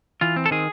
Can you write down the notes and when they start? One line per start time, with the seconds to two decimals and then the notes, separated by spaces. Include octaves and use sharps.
0.21 E3 F4
0.36 C4
0.46 A4
0.51 D#3 G#4